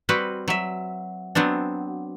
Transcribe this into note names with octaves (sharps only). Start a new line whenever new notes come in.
G3 C4 F#4 B4
F#3 E5
F#3 B3 C4 D4